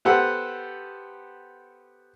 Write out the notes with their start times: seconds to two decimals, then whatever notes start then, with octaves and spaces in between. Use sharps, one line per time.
0.05 B3 G4 A4 B4 C5 F#5